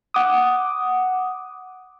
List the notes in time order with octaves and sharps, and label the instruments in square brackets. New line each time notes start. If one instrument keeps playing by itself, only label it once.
[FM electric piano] F#5 D6 D#6